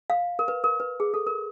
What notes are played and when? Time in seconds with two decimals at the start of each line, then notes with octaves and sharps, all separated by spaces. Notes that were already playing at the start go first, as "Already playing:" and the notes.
0.10 F5
0.39 A#4
0.48 B4
0.64 A#4
0.80 B4
1.00 G#4
1.14 A4
1.27 A#4